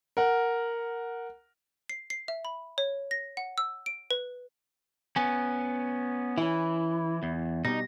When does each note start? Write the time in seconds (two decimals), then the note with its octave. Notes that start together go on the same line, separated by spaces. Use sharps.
0.17 A#4 F#5
1.89 C7
2.10 C7
2.28 E5
2.45 B5
2.78 C#5
3.11 A#6
3.37 F#5
3.58 E6
3.86 D7
4.11 B4
5.16 B3 C#4 G#5
6.38 E3 C#4 E4
7.23 E2
7.65 B2 G3 D#4 A#6